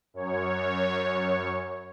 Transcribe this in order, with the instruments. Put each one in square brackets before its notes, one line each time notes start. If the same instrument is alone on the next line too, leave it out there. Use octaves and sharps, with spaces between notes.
[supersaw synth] F#2 C#5